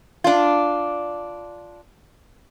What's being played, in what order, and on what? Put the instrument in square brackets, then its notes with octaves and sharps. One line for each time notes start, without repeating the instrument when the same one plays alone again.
[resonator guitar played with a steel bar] D4 F4